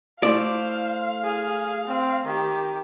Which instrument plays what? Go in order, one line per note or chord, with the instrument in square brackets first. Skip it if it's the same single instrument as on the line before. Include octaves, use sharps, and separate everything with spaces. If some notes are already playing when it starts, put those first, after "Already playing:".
[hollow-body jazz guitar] A3 E4 D5 [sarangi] C5 [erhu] F5
[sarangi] G#4
C4
[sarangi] D#3 [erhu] G4